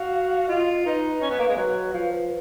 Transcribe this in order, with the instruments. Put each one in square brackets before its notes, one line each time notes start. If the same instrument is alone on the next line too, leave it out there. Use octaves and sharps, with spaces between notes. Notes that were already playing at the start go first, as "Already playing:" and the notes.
Already playing: [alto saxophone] F#4 [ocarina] F5
[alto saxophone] F4 [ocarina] D#5
[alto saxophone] D#4 [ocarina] B4
[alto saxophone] C#4
B3
A#3
G#3
[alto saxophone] F#3 [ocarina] B4
[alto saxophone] F3